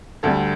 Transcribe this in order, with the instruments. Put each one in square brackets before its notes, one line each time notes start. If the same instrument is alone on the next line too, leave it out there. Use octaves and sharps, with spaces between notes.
[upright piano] D2 D3 G3 A4